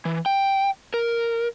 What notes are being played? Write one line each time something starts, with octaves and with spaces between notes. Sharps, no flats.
E3
G5
A#4